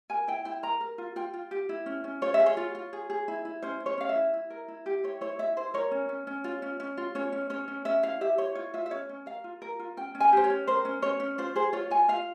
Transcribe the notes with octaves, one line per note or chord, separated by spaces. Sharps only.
A#4 G#5
E4 G5
E4 G5
A#4 A#5
A#4
F4
F4 G5
F4
G4
E4
C#4
C#4
F4 C#5
E5
G#4
C#5
F4
F4
G#4
G#4
E4
E4
C#4 C5
C#4
C#5
C#4 F5
E5
E4
E4
A#4
E4
G4
E4 C#5
E4 C#5
E4 E5
E4 C5
A#4 C#5
C#4
C#4
C#4
F4
C#4
C#4
F4
C#4 C#5
C#4
C#4 C#5
C#4
C#4 E5
E4 F5
G4 E5
E4 C#5
F4 C#5
F4 E5
E5
C#4 C#5
C#4
A#4 F5
F4
A#4
F4
C#4 G5
C#4
G#5
G4 C5
C#5
C#4
A#4 C5
C#4
C#4 C#5
C#4
F4 C5
G#4 C5
F4 C#5
F4 G#5
F4 F5